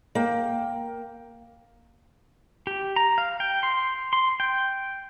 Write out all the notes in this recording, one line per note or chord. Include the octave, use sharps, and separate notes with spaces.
A#3 G5
G4
A#5
F5
G5
C6
C6
G5